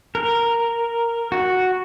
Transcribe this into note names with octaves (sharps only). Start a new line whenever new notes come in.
A#4
F#4